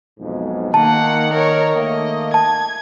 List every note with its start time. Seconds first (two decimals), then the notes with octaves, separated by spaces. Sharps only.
0.20 B1 F2 G#2
0.74 D#3 A#3 F#5 A5
1.33 A#4 C#5
1.75 D#3 A3 A#3 D#5
2.34 A5 G#6